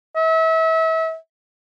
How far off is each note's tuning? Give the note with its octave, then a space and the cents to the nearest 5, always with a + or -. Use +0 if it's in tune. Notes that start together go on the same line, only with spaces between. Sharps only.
E5 -35